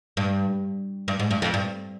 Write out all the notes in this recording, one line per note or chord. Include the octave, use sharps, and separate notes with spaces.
G2
G2
G#2
G2
F2
G2